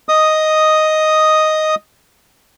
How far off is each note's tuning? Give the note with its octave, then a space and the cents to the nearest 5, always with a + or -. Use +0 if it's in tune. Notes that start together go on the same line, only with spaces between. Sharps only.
D#5 +0 D#6 +0